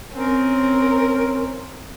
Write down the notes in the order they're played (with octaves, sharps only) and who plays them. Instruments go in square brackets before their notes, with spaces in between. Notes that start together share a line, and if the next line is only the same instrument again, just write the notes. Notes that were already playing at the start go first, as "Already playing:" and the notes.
[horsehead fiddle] C4 C#4 [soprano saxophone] A#4